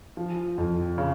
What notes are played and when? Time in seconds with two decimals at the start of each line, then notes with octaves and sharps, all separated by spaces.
0.17 F3
0.58 F2
0.98 C#3